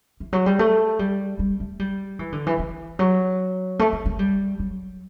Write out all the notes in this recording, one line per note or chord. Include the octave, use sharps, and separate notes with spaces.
E3
F#3
G3
A3
G3
G3
A3
G3
E3
D3
E3
E3
F#3
A3
A3
A3
G3
F#3